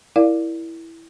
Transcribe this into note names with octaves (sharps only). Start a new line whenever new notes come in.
E4 A#4 D5 F5